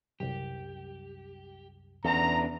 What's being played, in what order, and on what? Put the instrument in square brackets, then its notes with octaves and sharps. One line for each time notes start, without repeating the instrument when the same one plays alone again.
[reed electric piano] C2 F#2 [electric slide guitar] G4
[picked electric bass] E2 [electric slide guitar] C#4 D4 A4 [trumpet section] A#5